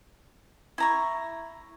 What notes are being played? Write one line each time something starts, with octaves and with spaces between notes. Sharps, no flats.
E4 A#5 C#6